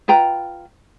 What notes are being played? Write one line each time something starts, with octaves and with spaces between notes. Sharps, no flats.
F4 B4 G5 A#5